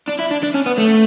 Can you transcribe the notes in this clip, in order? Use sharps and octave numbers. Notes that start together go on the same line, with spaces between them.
D4
E4
D4
D4
C#4
B3
A3